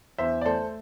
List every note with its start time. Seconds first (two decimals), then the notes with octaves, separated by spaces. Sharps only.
0.18 E2 C5 E5
0.41 D5
0.45 A3 A4 C5